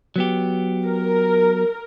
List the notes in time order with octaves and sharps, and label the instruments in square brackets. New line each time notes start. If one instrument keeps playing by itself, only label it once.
[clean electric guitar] F#3 B3 G4
[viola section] A#4